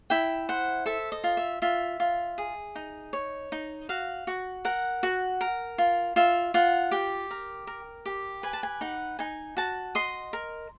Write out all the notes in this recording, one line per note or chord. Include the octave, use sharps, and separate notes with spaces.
E4 G5
C5 F#5
A4 E5
D#5
F4
E5
F4 E5
F4
G#4
D#4
C#5
D#4
F#4 F5
F#4
A#4 F#5
F#4
A#4
F4
F4 E5
F4 F#5
G4 G5
A#4
A#4
G4
B4 G#5
A5
G#5
D#4 F#5
D#4 G#5
F#4 A5
D#5 C6
A#4